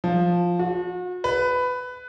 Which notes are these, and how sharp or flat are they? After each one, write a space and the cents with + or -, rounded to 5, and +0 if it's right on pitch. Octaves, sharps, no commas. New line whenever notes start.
F3 +5
F#4 -40
B4 +15